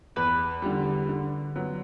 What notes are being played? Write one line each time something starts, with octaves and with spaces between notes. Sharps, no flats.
E2 B4
D3 G3
D3
F#3 B3